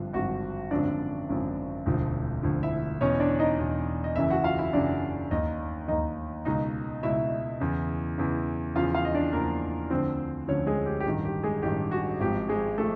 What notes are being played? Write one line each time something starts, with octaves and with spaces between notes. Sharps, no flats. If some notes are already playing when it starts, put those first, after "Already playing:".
Already playing: G#1 G2 D3 F3 F4
G#1 G2 D3 F3 F#4 F#5
G#1 F#2 D3 F3 D4 D5
G#1 F#2 D3 F3
E1 D2 D3 F3
E1 D2 D3 F3
E4 E5
E2 B2 C#4 C#5
D4 D5
D#4 D#5
E2 B2
D#5
F#1 F#2 C#3 E3 E4 E5
F#4 F#5
F4 F5
E4 E5
F#1 F#2 C#3 E3 D4 D5
D#2 D#3 D#4 D#5
D#2 D#3 D#4 D#5
C#2 B2 D#4 D#5
C#2 B2 E4 E5
E2 C#3 E3
E2 C#3 E3
E2 C#3 F3 F4 F5
F4 F5
D#5
D4 D5
E2 C#3 F3 A#3 A#4
D2 D3 F3 C4 C5
D2 D3 F3 C#4 C#5
G#3 G#4
G4
G4
A1 G2 D#3 F#4
G4
G#3 G#4
A1 G2 D#3 G4
F#4
G#1 G#2 F3 G4
G#3 G#4
F3 A3 A4